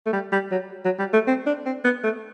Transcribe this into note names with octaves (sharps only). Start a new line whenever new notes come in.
A3
G3
G3
F#3
F#3
G3
A3
C4
D4
C4
B3
A3